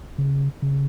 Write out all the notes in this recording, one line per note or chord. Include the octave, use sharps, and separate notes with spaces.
C#3
C#3